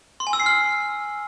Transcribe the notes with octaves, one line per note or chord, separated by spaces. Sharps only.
C6
G#5
E6
C7
F6